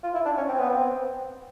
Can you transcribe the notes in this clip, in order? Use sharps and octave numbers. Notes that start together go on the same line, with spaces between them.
F4
E4
D4
C#4
C4
B3
C4